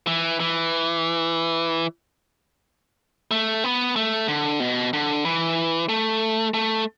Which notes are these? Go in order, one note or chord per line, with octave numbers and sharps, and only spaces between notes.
E3
E3
A3
B3
A3
D3
B2
D3
E3
A3
A3